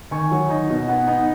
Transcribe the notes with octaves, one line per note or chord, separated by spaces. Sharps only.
D#3 G#5 C#6
F#3
D#4
B2
B3
D#4